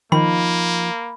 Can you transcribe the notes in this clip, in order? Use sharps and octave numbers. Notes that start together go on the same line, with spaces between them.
D#3 F3 A#3 D#4 B5